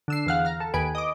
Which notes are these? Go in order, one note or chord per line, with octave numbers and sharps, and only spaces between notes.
D3 E6 C7
E2 F5 F#5
F5 A#5
A4
D#2 B4 G#5 D7
D#5 D6